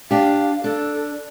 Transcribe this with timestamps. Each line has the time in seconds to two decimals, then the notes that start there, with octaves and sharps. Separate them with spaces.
0.11 D4 G4 F5
0.64 D4 A4